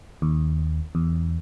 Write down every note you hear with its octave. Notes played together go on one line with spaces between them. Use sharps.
D#2
E2